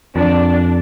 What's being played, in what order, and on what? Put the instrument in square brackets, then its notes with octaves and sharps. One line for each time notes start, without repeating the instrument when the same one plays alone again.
[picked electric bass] F2 [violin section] D4